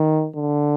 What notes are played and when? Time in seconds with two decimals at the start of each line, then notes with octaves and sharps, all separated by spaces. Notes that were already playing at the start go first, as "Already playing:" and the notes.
Already playing: D#3
0.36 D3